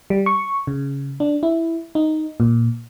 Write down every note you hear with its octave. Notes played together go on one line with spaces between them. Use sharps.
G3
C#6
C#3
D4
E4
D#4
A#2